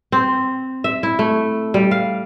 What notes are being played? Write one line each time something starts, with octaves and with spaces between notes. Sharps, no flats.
C4
E5
E4
A3
G3
F5